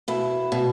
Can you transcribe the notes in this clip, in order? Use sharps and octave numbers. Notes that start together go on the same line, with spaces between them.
B2 E4
B2